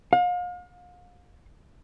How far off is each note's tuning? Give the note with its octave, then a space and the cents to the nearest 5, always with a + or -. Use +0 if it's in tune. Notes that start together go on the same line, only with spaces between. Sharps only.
F5 +35